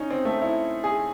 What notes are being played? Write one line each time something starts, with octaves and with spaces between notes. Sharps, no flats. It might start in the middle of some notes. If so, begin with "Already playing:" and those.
Already playing: C#4 D#4
C4
A3
E4
G#4